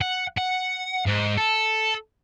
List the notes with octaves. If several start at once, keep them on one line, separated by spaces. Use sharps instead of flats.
F#5
F#5
G#2
A4